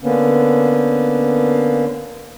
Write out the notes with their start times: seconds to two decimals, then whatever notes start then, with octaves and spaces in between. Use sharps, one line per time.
0.02 D3 A#3 B3 C#4